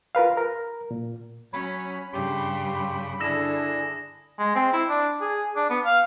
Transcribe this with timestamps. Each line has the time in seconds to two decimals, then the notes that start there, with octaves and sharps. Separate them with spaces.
0.15 F4 A#4 B4 F5
0.37 A#4
0.91 A#2
1.53 F#3 C#4 C#5 B5
2.13 G2 C#3 G4 C6
3.20 D3 D4 E4 G#4 E6 A#6 E7
4.39 G#3
4.56 C4
4.73 E4
4.89 D4
5.21 G#4
5.56 D4
5.70 B3
5.85 F5